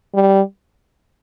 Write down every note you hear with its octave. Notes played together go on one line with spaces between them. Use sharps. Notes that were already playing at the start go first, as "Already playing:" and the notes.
G3